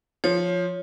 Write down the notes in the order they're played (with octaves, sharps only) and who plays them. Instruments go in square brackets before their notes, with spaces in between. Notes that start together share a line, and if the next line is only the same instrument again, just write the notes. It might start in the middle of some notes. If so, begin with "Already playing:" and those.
[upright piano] F3 [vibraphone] C#5